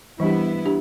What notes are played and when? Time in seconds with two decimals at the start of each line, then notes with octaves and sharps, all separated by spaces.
0.20 E3 G3 B3 D4 E4 G4
0.66 D4 G4